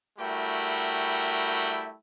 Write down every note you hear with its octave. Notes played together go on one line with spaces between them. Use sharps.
G3 A3 E4 F#4 A#4 G5